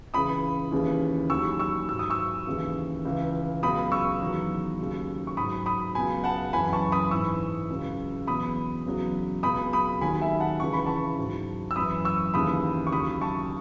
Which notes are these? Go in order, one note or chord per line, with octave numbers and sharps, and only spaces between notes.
C#2 C#3 E3 B5 D#6
D#2 C#3 E3
D#2 D#3 F#3 C#6 E6
C#6 E6
G#2 F#3 E6
D#6
C#6 E6
D#2 C#3 E3
C#2 C#3 E3
C#2 B2 F#3 B5 D#6
C#6 E6
E2 D#3 F#3
D#2 C#3 F#3
C#6
G#2 F#3 B5 D#6
B5 D#6
C#2 B2 F#3 G#5 B5
F#5 A5
F#2 E3 G#5 B5
A5 C#6
B5 D#6
G#2 E3 C#6 E6
C#2 C#3 F#3
E2 B2 F#3 B5 D#6
E2 C#3 F#3
C#2 B2 F#3 B5 D#6
B5 D#6
D#2 D#3 F#3 G#5 B5
E5 G#5
F#5 A5
C#2 C#3 E3 C#6
B5
A5 C#6
G#2 F#3
E6
F#2 E3 B5 D#6
C#6 E6
D#2 C#3 E3 B5 D#6
C#6
D#2 C#3 F#3 B5 D#6
A5 C#6